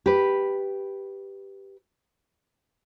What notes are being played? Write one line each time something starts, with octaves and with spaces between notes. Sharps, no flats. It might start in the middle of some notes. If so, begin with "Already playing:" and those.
G4 B4